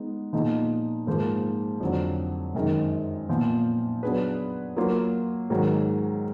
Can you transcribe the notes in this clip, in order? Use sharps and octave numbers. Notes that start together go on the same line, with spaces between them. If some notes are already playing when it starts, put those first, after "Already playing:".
Already playing: G#3 B3 D#4
A#2 F3 B3 D#4 G#4
G#2 F3 A#3
F2 D3 F#3
F#2 D#3 G#3 D#4
A#2 F3 B3
F#3 B3 D4 G#4 B4
F#3 A#3 F4
G#2 D#3 F#3